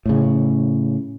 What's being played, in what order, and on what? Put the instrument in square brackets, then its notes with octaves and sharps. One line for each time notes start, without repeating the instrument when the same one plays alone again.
[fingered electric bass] A2 C#3